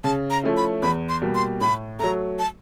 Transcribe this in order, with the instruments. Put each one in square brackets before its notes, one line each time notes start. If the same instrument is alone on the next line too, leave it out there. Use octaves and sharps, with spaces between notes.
[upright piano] C#3 [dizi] A5
[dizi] A#5
[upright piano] F3 A3 C#4 E4
[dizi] B5
[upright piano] E2 [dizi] B5
[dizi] C6
[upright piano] B2 G3 A#3
[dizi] C6
[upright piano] A2 [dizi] B5
[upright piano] F#3 A3 [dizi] A#5
[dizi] A5